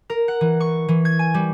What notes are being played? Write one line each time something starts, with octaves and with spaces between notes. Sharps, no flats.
A#4
F#5
E3
C#6
E3
G#6
G#5
G3